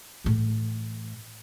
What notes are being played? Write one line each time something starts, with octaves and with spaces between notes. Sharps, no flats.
A2 E3